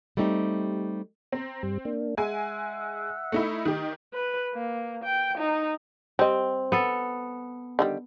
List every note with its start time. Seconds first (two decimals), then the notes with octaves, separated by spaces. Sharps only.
0.17 G3 A3 C4 D#4 G4
1.32 C4 A#5
1.63 G2 G3
1.85 A#3 D4
2.17 G#3 E5 F#5 G#5
3.32 A3 D#4 E4
3.65 D#3 G4 D#5
4.14 B4
4.54 A#3
5.04 G5
5.38 D#4
6.19 G3 C4 D#5
6.72 B3 A4
7.79 D3 D#3 G3